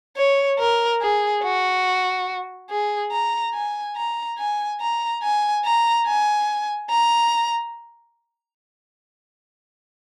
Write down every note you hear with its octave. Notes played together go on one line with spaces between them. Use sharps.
C#5
A#4
G#4
F#4
G#4
A#5
G#5
A#5
G#5
A#5
G#5
A#5
G#5
A#5